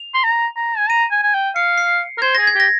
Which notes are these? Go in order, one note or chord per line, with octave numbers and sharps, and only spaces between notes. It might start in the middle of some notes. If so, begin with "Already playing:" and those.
Already playing: F7
C6
A#5
A#5
G#5
A#5 D#7
G#5
G#5
G5
F5 C#7
C7
A#4
C5 G#6
G#4 A#6
G#6
G4 A#6